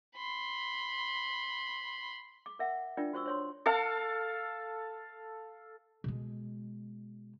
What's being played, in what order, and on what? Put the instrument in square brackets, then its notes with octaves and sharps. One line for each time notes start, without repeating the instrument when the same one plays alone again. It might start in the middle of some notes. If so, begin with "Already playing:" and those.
[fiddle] B5 C6
[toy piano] D6
A#4 E5 F#5
D4 F4 A#4 D5 G5
F#4 C5 C#6 E6
C5 C#5 C6
[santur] A4 F5 A5
[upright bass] B2 G#3